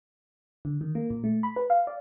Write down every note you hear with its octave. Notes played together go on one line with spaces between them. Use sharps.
D3
D#3
A#3
A#2
A3
B5
B4
F5
D5